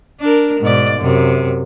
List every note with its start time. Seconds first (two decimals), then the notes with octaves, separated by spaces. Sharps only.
0.20 D4 A#4
0.61 G#2 B2 D5
1.00 F#2 C3